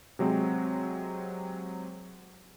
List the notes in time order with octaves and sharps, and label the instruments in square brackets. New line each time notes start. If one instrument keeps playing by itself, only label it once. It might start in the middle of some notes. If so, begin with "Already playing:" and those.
[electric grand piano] C3 F#3 G#3 C4